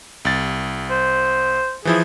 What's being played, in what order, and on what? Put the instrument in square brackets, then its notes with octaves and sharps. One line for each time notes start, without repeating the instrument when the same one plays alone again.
[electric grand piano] C2 A6
[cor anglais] C5
[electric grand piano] E3 F3 E4 [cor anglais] G#4